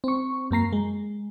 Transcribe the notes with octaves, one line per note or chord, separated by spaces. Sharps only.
C4 C#6
F#2 A#3 A#5 C7
G#3